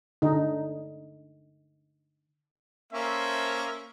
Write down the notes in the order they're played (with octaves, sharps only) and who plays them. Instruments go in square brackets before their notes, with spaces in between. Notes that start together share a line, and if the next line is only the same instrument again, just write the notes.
[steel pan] D3 D#4
[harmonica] A#3 C#4 [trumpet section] A4 C5 E5